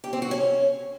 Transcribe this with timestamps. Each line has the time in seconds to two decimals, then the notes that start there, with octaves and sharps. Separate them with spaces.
0.04 G4
0.13 C4
0.22 F#4
0.31 C#4